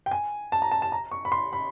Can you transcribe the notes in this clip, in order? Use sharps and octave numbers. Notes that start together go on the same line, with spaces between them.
G5
G#5
A5
A#5
A5
A5
A#5
C#6
B5
C6
B5